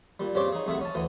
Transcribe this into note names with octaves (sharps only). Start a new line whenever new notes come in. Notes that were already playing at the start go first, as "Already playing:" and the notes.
A#2 G3
G2 C#3 G3 C4 C#5 D6
D#4 G#4
C2 A3 G#4 E5 F#5
C#4 A5
D2 E3 F#5 D#6